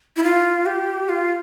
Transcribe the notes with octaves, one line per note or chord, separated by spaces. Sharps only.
E4
F4
G4
F4